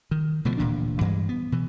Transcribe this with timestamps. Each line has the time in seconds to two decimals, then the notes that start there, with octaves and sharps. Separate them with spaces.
0.11 D#3
0.45 B2 D3 F3 A3
0.57 D1 A#2 E3 D4
1.01 G2 E3 G3 G#3
1.29 B3
1.52 B2 E3